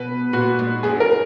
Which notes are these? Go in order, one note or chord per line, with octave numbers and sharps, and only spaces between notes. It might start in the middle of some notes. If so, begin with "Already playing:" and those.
Already playing: B2 B4
A#2 F#4
G#2
F#2 G#4
A#4